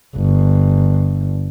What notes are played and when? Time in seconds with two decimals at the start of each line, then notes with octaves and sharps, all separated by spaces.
0.17 G1